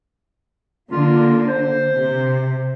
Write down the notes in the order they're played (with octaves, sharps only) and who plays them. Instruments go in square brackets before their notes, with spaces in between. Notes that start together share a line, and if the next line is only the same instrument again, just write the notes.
[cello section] D3 A#3 [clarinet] F4
[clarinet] C5
[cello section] C3